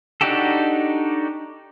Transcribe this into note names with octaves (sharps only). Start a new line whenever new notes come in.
D4 D#4 F#4 G4 A4